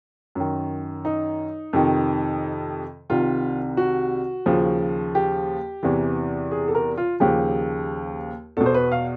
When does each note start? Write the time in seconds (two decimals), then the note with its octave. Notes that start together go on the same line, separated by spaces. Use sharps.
0.35 F#2 D#3
1.05 D#4
1.73 F2 C3 D#3
3.10 C2 C3 D#3 F4
3.77 F#4
4.46 D#2 C#3 F3
5.15 G4
5.83 E2 C3 E3
6.51 G#4
6.68 A4
6.75 A#4
6.97 F4
7.20 D#2 C#3 F3 G4
8.57 E2 B2 A4
8.66 C5
8.74 B4
8.92 F5